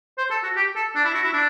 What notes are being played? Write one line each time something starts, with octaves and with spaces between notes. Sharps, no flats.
C5
A4
F#4
G4
A4
D4
E4
F#4
E4
D4